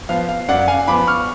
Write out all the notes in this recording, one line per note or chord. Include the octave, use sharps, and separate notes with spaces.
F3 B3 F5
F5
F#2 D5 F#5
F5 G#5
F3 B3 B5 D6
C#6 F6